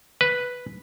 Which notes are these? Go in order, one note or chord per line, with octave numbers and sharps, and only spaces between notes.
B4